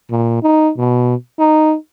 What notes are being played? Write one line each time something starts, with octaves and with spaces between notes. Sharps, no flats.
A#2
D#4
B2
D#4